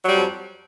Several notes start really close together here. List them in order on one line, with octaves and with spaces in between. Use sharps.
F#3 G3 F2